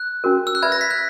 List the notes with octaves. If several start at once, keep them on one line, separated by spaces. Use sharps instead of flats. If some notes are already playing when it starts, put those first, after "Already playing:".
Already playing: F#6
C#4 F#4 A#4
E6
F#6
B4 E5 B5 G#6
A#6
B6
F#6